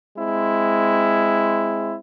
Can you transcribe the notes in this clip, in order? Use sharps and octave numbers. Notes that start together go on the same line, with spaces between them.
G#3 C4 E4